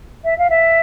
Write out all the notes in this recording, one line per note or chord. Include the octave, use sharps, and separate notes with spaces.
E5
F5
E5